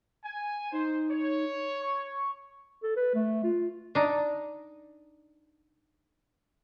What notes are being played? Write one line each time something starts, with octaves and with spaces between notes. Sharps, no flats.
G#5
D#4 C5
C#5
C#6
A4
B4
A3
F4
D4 D#4